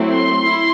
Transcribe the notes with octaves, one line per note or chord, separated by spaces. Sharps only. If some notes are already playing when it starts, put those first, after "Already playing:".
Already playing: F#3 A3 C4 E4
C6
E4